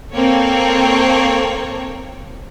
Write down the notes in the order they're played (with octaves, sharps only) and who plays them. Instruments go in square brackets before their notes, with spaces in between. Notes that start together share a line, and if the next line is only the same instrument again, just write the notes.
[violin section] A#3 C4 A4 C#5